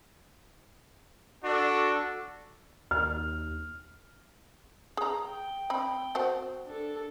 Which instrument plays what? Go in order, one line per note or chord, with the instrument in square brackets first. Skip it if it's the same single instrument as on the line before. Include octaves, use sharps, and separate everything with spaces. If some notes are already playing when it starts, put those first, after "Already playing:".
[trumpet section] D4 F#4 A4
[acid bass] D#2 [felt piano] F6
[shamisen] G#4 A#5
[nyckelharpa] G5
[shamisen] C4 B5
C4 F#4 C5
[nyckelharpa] D4 A4